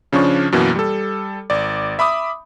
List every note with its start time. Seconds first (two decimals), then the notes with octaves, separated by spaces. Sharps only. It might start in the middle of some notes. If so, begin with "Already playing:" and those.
0.13 C#3 F3 C#4 D4 C#6
0.52 F#2 B2 E3 A#3
0.76 G3 A4
1.50 G#1 D5
1.99 E5 B5 D6 D#6